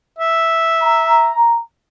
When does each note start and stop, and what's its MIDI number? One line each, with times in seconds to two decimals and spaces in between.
0.19 1.32 76
0.83 1.60 82